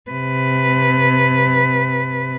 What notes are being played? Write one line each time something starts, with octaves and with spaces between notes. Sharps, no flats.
C3 B4